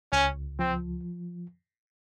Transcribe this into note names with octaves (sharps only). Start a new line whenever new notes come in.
C#2 C#4
F3 C4